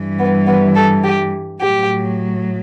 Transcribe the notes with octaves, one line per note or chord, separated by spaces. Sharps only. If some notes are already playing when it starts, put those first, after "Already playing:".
Already playing: G2 E3 G3
B3
B3
A4
G4
A2 F#3 G4